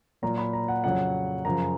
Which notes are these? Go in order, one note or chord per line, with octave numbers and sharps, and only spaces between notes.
A#2 F#3 A#5
B5
A#5
F#5
F2 C#3 F#3 F#5
F#2 C#3 F3 A#5